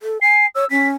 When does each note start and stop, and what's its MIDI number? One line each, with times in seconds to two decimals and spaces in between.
0.01 0.21 69
0.22 0.46 80
0.22 0.45 96
0.55 0.65 73
0.55 0.70 88
0.70 0.94 61
0.70 0.88 95